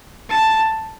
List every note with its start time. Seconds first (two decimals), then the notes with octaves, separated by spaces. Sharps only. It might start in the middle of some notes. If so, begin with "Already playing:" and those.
0.30 A5